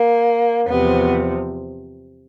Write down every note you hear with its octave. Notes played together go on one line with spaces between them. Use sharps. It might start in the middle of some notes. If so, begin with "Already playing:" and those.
Already playing: A#3
E2 C3 F3 B3